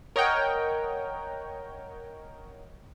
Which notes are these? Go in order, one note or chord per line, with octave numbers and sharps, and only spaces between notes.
A#4 C#5 D#5 F#5 G5